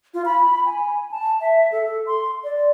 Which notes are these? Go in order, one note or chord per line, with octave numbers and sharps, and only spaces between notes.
F4
B5
G#5
A5
E5
A4
C6
D5